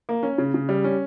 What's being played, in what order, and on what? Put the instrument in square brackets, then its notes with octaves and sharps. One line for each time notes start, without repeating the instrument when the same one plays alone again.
[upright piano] A#3
C#4
C#3
C#3
G3
C#4